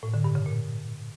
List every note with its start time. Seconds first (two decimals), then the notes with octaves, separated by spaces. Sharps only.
0.03 A2
0.14 D3
0.24 G2
0.35 C#3
0.46 A#2